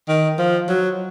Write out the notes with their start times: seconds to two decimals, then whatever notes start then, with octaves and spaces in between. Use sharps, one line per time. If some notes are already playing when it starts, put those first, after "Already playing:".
0.09 D#3
0.39 F3
0.69 F#3